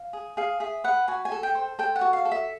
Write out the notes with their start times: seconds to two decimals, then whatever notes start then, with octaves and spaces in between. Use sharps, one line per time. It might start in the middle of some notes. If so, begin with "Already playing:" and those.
Already playing: F5
0.13 G#4
0.37 G#4 F5
0.60 G#4 E5
0.84 B4 F#5
1.08 F#4 G#5
1.25 G#5
1.32 A4
1.43 G5
1.55 C5
1.79 A4 G5
1.96 F#5
2.01 F#4
2.13 F5
2.25 A4
2.31 E5